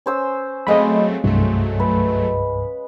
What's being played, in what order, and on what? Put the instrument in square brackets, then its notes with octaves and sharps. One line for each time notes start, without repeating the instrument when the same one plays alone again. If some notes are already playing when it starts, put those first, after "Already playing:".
[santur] C#4 C5 E6
[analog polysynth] F#3 A3 C4 [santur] G#3 F5 [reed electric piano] D#5 B5
[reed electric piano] C2 G2 [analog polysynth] F#3 A3
[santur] B4